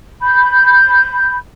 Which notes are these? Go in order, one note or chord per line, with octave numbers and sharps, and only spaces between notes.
B5 G6